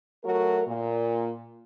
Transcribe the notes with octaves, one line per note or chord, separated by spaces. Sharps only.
F#3 A3 F#4 A#4
A#2